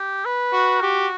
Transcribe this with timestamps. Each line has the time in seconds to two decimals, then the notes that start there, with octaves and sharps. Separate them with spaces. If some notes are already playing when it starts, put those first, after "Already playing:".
Already playing: G4
0.25 B4
0.53 F#4
0.81 F#4 G4